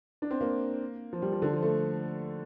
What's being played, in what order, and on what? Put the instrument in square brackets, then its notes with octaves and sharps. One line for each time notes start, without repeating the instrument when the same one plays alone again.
[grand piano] D4
C4
A#3
F3
G3
F3
D3
F3
A3